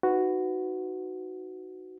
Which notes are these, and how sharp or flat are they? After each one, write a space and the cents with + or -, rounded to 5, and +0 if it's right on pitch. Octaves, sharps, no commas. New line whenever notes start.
D#4 +0 F#4 +0 B4 +20